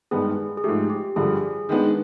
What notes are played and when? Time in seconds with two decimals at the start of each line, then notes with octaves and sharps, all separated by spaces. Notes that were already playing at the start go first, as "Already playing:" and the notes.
0.11 G2 D#3 G#3 B3 G#4
0.57 G#4
0.64 G#2 F3 A3 G4
0.90 G4
1.16 G2 D3 F3 G#4
1.69 D#3 G#3 B3 D4